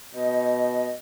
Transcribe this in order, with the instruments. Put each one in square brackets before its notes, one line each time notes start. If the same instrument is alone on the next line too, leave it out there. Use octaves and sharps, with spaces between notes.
[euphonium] B2 [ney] D#5